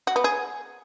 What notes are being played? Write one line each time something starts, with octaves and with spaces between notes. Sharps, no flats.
F#4
B3
G#4